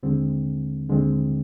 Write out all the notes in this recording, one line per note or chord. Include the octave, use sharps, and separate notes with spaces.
D#2 D3 G#3 C4
D#2 D3 G#3 C4